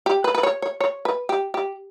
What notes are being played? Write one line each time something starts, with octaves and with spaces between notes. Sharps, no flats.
G4
B4
B4
C#5
C#5
C#5
B4
G4
G4